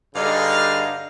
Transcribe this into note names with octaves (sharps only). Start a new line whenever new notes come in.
G2 D3 D#4 G#4 F5